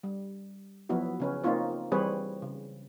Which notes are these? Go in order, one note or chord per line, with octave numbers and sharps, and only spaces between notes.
G3
F3 F#3 B3 E4 F#4
C#3 C#4 B4
A#3 C4 D#4 F4 C#5
E3 G3 C4 G#4 B4 C#5
C#3